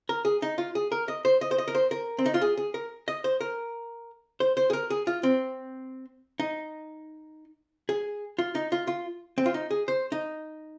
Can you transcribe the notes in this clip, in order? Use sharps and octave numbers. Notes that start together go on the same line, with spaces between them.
A#4
G#4
D#4
F4
G#4
A#4
D#5
C5
D#5
C5
D#5
A#4
C5
A#4
C4
D#4
F4
G#4
G#4
A#4
D#5
C5
A#4
C5
C5
G#4
A#4
G#4
F4
C4
D#4
G#4
F4
D#4
F4
F4
C4
F4
D#4
G#4
C5
D#4